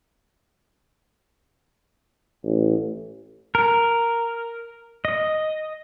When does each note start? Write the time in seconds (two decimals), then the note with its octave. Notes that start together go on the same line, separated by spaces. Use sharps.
2.44 A1
3.55 A#4
5.05 D#5